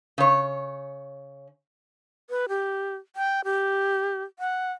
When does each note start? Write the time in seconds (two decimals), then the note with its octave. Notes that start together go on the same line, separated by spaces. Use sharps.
0.18 C#3 C#5
2.30 B4
2.49 G4
3.16 G5
3.45 G4
4.39 F#5